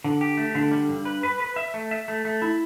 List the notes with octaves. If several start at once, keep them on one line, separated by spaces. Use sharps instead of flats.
D3
G4
A3
D3
G3
G2
B4
B4
B4
E5
A3
E5
A3
A3
E4